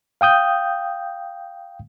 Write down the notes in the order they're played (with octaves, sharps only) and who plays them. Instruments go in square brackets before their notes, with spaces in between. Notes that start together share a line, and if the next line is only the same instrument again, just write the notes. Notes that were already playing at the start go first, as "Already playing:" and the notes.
[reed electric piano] F5 G5 D#6 G6